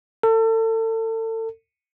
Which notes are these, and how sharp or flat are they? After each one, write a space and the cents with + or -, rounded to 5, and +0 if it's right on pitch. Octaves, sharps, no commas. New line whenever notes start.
A4 +35